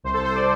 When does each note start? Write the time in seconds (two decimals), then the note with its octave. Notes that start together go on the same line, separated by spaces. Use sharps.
0.04 C2 C5
0.14 A4
0.19 C2
0.25 C5
0.35 D5